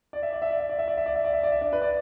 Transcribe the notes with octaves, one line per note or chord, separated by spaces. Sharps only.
D5
E5
D5
E5
D5
E5
D5
E5
D5
E5
D5
E5
D5
E5
D5
E5
D4 D5
B4
D5